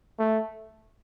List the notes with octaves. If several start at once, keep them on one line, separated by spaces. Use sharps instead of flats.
A3